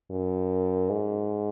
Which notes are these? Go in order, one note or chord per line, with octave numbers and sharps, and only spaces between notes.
F#2
G#2